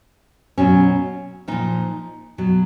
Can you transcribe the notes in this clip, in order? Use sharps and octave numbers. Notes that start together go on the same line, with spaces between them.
B2 F#3 C#4
A#2 F3 D#4
B2 F#3